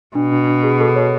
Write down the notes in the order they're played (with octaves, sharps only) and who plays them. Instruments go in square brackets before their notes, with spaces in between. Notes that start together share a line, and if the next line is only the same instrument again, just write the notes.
[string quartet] B2 [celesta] D4
[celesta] D4
D4
G#4
A4
C#5